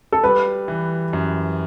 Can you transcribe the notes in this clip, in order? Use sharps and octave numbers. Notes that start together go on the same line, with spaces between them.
A4
G3 B4
E3
F#2